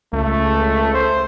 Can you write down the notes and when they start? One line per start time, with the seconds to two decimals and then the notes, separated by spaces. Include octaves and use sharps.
0.13 C#2 A3
0.94 C5